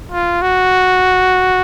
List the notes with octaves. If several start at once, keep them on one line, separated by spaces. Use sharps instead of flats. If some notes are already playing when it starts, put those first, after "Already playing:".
F4
F#4